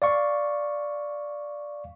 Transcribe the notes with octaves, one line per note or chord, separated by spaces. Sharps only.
D5 F5 C#6